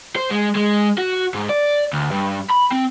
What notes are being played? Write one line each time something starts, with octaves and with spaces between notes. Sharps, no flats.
C5
G#3
G#3
F#4
G#2
D5
D2
G2
B5
C4